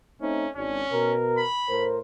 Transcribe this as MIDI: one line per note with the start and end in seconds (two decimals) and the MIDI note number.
0.21 0.46 57
0.21 0.46 60
0.21 0.50 61
0.21 0.46 63
0.55 0.82 32
0.55 1.14 61
0.55 0.82 62
0.93 1.44 47
0.93 1.44 70
1.38 1.86 83
1.69 1.99 45
1.69 1.99 70
1.69 1.99 72